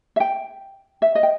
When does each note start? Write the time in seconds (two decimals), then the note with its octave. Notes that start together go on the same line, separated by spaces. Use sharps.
0.16 E5
0.20 G5
1.02 E5
1.15 D#5
1.23 G5